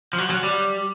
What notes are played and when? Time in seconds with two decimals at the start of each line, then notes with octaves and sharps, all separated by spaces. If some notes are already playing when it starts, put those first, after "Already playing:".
0.13 F3
0.18 F#3
0.30 F#3
0.43 G3